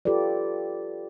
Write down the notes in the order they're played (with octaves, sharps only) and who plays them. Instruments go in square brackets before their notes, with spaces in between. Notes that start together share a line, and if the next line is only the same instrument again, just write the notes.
[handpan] F4 G4 A4 B4 D5